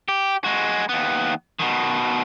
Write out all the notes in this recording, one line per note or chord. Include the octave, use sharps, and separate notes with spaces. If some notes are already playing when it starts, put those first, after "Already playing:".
G4
G#3 F#4
D#2 B3
B2 D#3